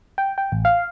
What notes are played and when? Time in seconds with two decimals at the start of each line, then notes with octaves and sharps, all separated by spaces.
0.18 G5
0.38 G5
0.52 A1
0.65 F5